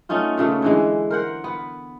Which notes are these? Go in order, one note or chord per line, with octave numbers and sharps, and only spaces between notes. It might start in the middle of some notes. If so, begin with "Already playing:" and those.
A3 C#4 D#4 F4
A#2 C#3 A3
D3 E3 G#3
A#4 C5 F#5
B3